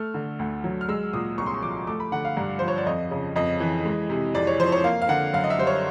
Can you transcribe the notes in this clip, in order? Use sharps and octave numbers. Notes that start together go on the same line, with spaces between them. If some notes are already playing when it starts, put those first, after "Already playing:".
Already playing: A3 F6
D3
D2
F#3
F6
G#3 E6
A#2 D#6
C2 C#6
C6
C#6
F3 D6
A3 D6
B5
D3 F#5
F5
G2
F3 C5
C#5
D5
F2 D#5
C#3
F2 D#5
E3
G#3
C3
F2 D5
C#5
F3 C5
C#5
A#3 F5
F5
D3 F#5
F#2 F5
D#5
E5
G3 C5
C#5